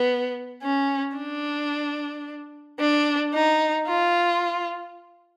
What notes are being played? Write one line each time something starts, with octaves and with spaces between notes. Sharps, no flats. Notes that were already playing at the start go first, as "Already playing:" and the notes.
Already playing: B3
C#4
D4
D4
D#4
F4